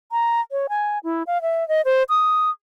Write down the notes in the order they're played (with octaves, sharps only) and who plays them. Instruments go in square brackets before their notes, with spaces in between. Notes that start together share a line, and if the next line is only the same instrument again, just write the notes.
[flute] A#5
C#5
G#5
E4
F5
E5
D#5
C5
D#6